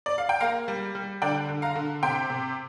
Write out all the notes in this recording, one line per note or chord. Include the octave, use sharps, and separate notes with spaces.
D5
F5
G5
A#3 F5 A#5
G3
G3
D3 D5 G5
D3
F5 A#5
D3
C3 G5 C6
C3